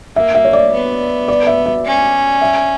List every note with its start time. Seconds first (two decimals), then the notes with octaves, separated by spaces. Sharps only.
0.16 A#3 E5
0.35 E5
0.45 C#5
0.53 D5
0.72 B3
1.28 D5
1.47 E5
1.66 E5
1.85 C#4
2.41 E5